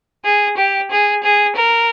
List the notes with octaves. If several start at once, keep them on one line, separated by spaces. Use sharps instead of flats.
G#4
G4
G#4
G#4
A#4